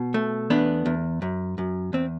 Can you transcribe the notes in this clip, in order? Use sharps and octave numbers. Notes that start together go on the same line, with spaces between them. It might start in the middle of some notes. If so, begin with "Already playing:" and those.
Already playing: B2
A3
E2 B3 D4
E2
F#2
F#2
E2 C4